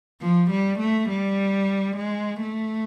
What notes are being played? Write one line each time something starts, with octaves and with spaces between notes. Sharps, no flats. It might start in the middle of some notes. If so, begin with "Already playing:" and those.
F3
G3
A3
G3
G#3
A3